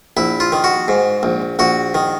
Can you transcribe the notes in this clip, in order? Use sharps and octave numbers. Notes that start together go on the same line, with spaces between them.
A#1 E4
F4
D#3
F#4
G#2
A#1
A#1 F#4
D#3